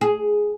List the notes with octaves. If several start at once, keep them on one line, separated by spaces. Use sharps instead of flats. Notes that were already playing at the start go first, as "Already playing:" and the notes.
G#4